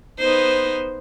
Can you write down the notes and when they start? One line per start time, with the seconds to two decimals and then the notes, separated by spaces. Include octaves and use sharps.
0.18 B3 D#4 C5